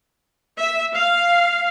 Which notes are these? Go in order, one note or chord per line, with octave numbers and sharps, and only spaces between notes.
E5
F5